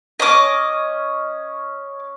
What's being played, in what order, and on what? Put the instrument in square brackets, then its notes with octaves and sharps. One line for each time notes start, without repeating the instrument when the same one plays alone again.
[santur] C#4 C#5 [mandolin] D#5 D6